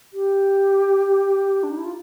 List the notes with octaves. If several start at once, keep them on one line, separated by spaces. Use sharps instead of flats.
G4
D4
D#4
E4
F4